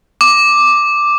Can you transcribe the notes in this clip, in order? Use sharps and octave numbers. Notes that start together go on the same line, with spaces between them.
D6